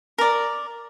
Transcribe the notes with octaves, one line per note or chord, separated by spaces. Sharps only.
A#4 D5